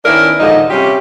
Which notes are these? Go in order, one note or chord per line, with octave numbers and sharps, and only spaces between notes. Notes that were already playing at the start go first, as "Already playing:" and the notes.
D#3 B3 C#4 D4 E4 A#4
D#2 A#2 D3 F3 G#3 D#4
C3 G3 C#4 F4 G4